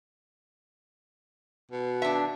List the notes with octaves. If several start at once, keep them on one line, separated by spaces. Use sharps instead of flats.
B2
D4 E5